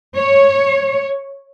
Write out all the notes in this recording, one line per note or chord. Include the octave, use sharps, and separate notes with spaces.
C#5